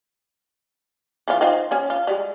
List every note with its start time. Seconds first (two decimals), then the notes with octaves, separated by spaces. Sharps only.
1.28 E3 C#4 F4
1.41 C4 D#4 F4
1.71 C#4 G#5
1.90 F4
2.07 G3 G#3